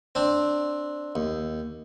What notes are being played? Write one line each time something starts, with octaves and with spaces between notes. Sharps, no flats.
C4 D4
D#2